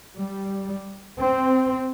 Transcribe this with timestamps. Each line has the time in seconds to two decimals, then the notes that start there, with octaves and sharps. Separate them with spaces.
0.18 G3
1.19 C4